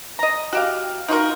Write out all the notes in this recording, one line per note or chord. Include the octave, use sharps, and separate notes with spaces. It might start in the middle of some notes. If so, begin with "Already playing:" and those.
D#5 A#5
F#4 G4 F5
D#4 F4 F#4 A#4